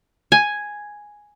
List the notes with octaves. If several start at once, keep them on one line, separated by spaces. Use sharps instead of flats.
G#5